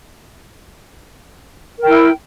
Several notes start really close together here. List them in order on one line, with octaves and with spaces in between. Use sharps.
A#4 G5 E4